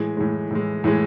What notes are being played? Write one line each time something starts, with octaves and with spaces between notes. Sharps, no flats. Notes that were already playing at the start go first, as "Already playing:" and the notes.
Already playing: A2 E3 G#3
A2 E3 G#3
A2 E3 G#3
A2 E3 G#3